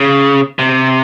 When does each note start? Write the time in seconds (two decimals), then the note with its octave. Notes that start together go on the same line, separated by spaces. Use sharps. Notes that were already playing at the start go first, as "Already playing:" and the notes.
Already playing: C#3
0.59 C3